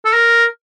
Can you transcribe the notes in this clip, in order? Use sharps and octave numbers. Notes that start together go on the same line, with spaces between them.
A4
A#4